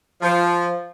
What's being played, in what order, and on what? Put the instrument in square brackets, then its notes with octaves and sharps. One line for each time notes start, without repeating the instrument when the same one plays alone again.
[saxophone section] F3